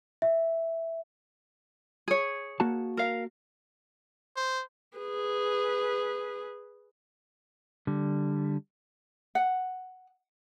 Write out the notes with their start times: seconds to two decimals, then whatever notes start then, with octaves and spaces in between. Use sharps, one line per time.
0.22 E5
2.08 G#4 C#5
2.60 A#3 F#4 A5
2.97 A#4 F5
4.36 C5
4.97 G#4 B4
7.87 D3 G3
9.35 F#5